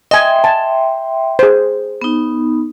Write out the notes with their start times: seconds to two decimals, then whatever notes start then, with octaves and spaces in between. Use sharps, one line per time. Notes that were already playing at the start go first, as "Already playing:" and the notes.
0.11 D#5 E5 G5 G#5 C6
0.44 G#5 A5
1.39 G#4 C5
2.02 B3 D#4